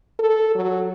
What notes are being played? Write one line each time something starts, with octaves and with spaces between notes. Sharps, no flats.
A4
F#3